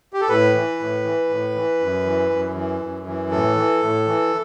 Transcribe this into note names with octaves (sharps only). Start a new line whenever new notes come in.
G4
A4
A2 B4
E3
A2
E3
A2
E3
F#2
E3
F#2
E3
F#2
E3
A2 A4
E3
A2
E3